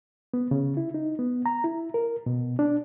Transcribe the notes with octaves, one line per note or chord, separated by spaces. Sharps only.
B3
C#3
E4
D#4
B3
A#5
E4
A#4
B2
D4